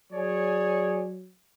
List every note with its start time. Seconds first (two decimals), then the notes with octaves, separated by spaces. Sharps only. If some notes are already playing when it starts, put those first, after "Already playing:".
0.12 F#3 G#4 C#5 D5